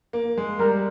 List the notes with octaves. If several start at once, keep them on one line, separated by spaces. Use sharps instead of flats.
A#3
G#3
G3 A#4